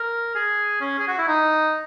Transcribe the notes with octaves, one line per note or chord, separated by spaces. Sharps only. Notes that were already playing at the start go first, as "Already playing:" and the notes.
Already playing: A#4
G#4
C#4
G#4
F#4
E4
D#4